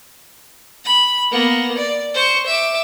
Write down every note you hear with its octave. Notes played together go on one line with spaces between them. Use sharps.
B5
A#3 B3
D5
C5 C#6
E5 D6